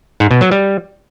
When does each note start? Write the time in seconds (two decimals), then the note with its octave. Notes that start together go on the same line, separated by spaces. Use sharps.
0.20 G#2
0.31 B2
0.41 F#3
0.51 G3